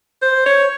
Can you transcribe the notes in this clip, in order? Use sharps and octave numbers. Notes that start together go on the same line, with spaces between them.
C5
C#5